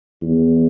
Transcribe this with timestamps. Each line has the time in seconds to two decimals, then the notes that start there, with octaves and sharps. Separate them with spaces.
0.22 E2